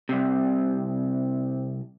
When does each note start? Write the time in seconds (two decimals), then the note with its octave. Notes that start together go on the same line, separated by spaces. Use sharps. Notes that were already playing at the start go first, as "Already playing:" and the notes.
0.09 C2 C3